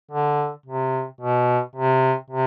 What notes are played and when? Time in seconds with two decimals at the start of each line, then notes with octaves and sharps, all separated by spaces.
0.11 D3
0.66 C3
1.21 B2
1.76 C3
2.30 C3